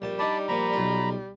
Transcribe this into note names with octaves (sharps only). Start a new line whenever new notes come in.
A#1 G3 A5
D4 D#4 D5 A5 B5
A#2 F3 A#5 B5
B1 F4